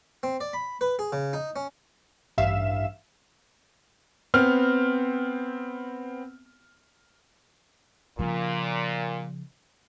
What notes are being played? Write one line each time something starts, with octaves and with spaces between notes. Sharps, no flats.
C4
D5
B5
B4
G#4
C#3
D#4
C#4
A1 G2 E5 F5 E7
B3 C4 F6
A#2 C#3 F3